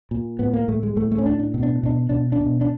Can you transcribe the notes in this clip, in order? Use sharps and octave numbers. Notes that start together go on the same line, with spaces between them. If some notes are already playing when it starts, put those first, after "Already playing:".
A#2
A2 B3
A#3
A2 A3
G#3
A2 A3
A3
C#4
A2 D4
D4
B2
D4
B2 D4
B2 D4
D4
B2
D4